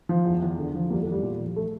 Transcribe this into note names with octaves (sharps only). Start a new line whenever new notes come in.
F3
E2
E2
D3
F3
E2 G3 A#3
A3
E2
G3
A#2
F3
A3